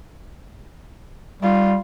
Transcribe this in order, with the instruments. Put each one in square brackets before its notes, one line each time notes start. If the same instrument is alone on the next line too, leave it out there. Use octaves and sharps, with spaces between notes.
[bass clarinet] G3 [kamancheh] F4